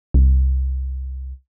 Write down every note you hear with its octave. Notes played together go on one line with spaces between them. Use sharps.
C2